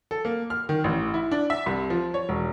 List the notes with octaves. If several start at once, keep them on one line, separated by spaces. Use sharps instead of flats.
A4
A#3
F6
D#3
A1
E4
D4
E5
C2
F3
C#5
E1